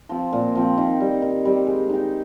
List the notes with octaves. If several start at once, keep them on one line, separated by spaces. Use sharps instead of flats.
F3 C4
A#2
F3 C4
D#3
G3 C4
D#3
G3 C4
G#3
D#4 G4